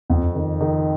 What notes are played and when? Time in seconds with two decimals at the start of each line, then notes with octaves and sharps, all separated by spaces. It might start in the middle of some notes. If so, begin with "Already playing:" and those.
0.10 F2
0.35 D#3
0.61 D#3